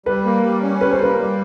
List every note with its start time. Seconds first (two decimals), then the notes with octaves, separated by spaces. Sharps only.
0.06 G3 B4
0.25 A#3
0.43 G3
0.62 C#4
0.81 G3 B4
0.92 C5
0.99 A#3 B4
1.18 G3